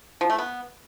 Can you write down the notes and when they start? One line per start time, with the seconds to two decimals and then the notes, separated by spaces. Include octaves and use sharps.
0.21 F3
0.30 A3
0.38 B3